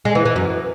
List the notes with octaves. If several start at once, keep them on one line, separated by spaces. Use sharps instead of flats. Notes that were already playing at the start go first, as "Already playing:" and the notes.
G#3
E3
E3
F#2